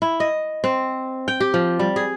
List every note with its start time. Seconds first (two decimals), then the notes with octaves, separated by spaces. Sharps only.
0.02 E4
0.20 D#5
0.64 C4
1.28 G5
1.40 G4
1.54 F3
1.79 G3
1.96 G#4